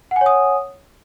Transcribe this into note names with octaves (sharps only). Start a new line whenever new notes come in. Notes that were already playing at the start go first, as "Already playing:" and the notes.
C#5 F#5 G#5 D#6